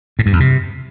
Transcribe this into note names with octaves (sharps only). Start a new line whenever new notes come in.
A2
G2
E2
C3